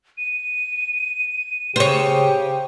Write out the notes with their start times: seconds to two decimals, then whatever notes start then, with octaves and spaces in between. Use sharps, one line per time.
0.17 D#7
1.76 C#3 G4 C5 C#5